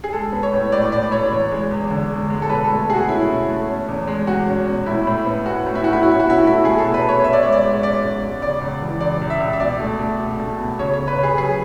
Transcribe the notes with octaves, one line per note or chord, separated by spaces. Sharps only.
G#4
G#3 A4
B3
C#5
A2
A2 D5
A2 D5
A2 C#5
E2
G#3
E2
D3
G#3
G#3
A4
B2 B4
A4
A3
B2 F#4 G#4
C#4 E4
B2
A3
C#4
E2
G#3
E2 F#4
C#4
B2
A2 E4
A2
B3
A2 F#4
A2
E4
A2 F#4
E4
C#4 F#4
E4
F#4
B2
E4
F#4
A3 E4
A3 G#4
A4
B2
B4
B2
C#5
C#4 E5
D5
G#3 C#5
D5
G#2
C#4 D5
G#2
G#2
C#3 D5
C#2
E3
C#2 D5
C#2
E5
C#2
E5
B2 D5
A3
A3
B2
A3
B2
C#3 C#5
C#5
C#3
B4
C#3
G#4
F#3 G#4